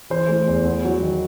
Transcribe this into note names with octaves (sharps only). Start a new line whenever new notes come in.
E3 C5
A3
E2
B3
F#3
D#3